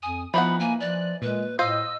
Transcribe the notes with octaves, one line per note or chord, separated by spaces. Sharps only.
F2 G#5 D#6
E3 F3 B3 D#4 F#5 B5
A#3 G#5
F3 D5 F#6
A#2 G#3 B4
A2 F4 C5 D#5 F5 E6